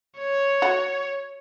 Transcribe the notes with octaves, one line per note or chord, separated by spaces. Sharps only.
C#5
F#4